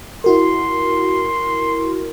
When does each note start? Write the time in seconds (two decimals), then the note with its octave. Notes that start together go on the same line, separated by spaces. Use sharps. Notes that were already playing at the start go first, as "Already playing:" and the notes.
0.24 E4 F#4 A#4 C6